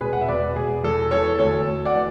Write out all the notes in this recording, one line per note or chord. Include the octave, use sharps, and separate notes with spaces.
E1 G#4 B4
F#5
E5
E1 B4 D5
E1 G#4
E2 A4
E3 A4 C#5
D2 A4 C#5
D2
D5 F#5
E3